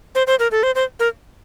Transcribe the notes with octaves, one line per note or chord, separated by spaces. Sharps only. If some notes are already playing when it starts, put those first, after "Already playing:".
C5
C5
A#4
A4
C5
C5
A#4